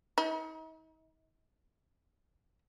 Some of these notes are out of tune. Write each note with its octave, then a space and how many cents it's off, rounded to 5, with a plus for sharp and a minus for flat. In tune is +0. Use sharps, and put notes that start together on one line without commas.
D#4 +40